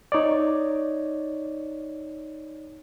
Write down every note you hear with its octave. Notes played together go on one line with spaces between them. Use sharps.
D#4 C#5 D5